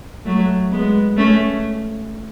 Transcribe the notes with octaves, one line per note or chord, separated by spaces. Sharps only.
F#3 A3
G#3 B3
A3 C#4